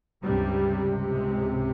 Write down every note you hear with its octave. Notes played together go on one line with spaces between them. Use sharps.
C#2 G2 C3 G3
G#2 G#3